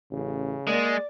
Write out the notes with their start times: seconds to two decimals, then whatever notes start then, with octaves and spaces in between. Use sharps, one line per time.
0.12 A1 C#3
0.67 G#3 A#3 D5